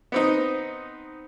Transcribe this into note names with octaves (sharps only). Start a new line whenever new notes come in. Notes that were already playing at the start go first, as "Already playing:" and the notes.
B3 C4 D#4